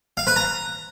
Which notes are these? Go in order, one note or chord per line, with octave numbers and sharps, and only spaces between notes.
F5
B4
A#5